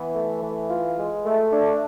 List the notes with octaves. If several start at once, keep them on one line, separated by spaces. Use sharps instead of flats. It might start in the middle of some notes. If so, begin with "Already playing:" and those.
Already playing: E3 B3
A3
E3
F4
G#3
A3
D4